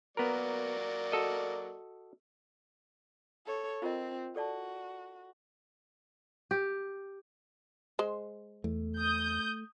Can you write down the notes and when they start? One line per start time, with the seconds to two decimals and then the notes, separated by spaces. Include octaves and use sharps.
0.17 F#3 A#3 B3 A#4 D5
1.12 F#4 A4 D#5
3.46 A4 C#5
3.82 C4 F4 A#4 D#5
4.36 F#4 A4 D5 A5
6.51 G4
7.99 G#3 C5
8.64 E2 A3
8.98 D#6 G6